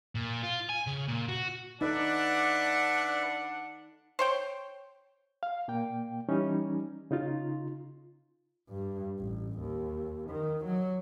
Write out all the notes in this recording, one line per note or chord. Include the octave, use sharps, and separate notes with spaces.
A#2
F4
G#5
C#3
A#2
F#4
D4 D#4 A4 B4 D5 E5 F#5
C5 C#5 G5
F5
A#2 A#3 G5
E3 G3 C#4 D#4
C#3 D#4 F4
G2
A1
D#2
D#3
F#3